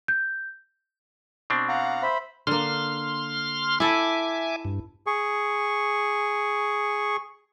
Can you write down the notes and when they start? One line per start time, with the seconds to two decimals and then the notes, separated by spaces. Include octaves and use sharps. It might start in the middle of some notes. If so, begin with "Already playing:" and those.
0.08 G6
1.50 B2 C4 D4
1.69 F5 F#5 A#5
2.02 C5 E5 B5
2.47 D3 A#3 C6 F6
3.80 E4 A4 E5 G#5 D6
4.65 G2
5.07 G#4 C#6